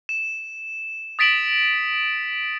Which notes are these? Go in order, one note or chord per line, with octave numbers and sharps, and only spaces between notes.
E7
D#6 A6 B6 D7 E7 F#7